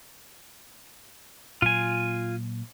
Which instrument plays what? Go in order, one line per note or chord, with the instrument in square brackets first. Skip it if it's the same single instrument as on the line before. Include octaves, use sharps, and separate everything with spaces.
[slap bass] A#2 F#3 A#3 [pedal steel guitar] F4 G#5